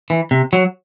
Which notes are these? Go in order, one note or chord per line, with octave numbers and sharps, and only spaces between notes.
E3
C3
F#3